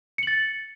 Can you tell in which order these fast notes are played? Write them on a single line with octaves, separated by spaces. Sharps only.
C#7 F#7 A6